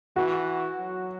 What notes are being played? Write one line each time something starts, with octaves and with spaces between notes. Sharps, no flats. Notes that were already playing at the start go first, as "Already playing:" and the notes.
E3 F#4
F#3